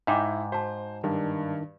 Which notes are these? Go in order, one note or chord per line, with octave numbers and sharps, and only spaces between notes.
G#2 D#4 E4 F5 G5 D6
F#4 C5 A5
G2 D#3 D4